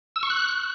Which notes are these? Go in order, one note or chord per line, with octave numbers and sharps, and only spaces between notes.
E6
C#6
F#6